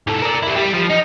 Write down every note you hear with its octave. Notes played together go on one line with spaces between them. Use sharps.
G#2 A4
A#4 D5
E4 G4
G3 G4
F3
D#4